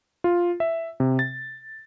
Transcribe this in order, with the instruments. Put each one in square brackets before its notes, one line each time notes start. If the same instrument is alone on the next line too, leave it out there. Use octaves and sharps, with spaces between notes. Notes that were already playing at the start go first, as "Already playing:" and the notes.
[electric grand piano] F4
E5
C3
A6